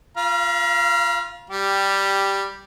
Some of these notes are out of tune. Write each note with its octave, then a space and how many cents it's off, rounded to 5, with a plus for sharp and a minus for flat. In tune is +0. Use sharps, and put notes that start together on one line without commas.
F4 +0 F5 -30 A#5 +45
G3 +0 G4 +5